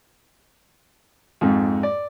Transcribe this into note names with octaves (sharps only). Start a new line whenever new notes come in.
F2 G#2
D5